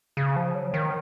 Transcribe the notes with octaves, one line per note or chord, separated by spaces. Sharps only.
C#3
F3
F#3
D#3